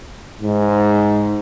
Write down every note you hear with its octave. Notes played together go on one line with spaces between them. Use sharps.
G#2